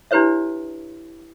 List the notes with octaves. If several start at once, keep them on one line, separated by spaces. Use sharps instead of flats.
D4 E4 G4 B4 C#5 E5